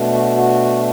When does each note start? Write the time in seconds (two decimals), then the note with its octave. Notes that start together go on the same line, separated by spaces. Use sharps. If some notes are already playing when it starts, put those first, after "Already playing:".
Already playing: B2 A3 D4
0.15 F#4
0.36 F#4